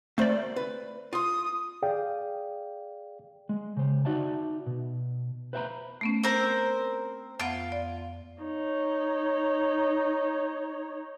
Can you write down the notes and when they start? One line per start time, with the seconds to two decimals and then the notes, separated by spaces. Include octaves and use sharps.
0.18 D2 A3 A#3 C4 C5 D5
0.56 B4
1.13 F4 C6 D#6
1.82 G#4 D5 F5 G5
3.49 G#3
3.77 C#3 C5
4.05 D#4 F#4 D5 E5 A5
4.66 B2
5.53 B4 C5 E5 F5 A#5 B5
6.01 A3 B3 C#4
6.23 C4 A#4 C5 E6
7.40 F2 B3 F4 F#5
7.72 D5
8.43 D#4 C#5